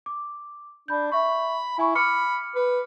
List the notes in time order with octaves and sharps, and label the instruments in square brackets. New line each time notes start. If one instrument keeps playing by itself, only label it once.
[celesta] D6
[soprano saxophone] D4 [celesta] B5 G6
[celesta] E5 C#6 [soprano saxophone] B5
[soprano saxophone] E4 [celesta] G#5 B5 C#6
[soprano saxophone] B5 [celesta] D6 F6 C#7
[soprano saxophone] B4